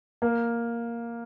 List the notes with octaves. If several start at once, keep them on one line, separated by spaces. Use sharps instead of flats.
A#3